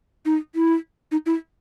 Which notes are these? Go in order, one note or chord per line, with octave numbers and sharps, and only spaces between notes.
D#4
E4
D#4
E4